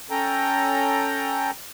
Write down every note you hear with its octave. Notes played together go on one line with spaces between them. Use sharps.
C#4 A4 G5 A#5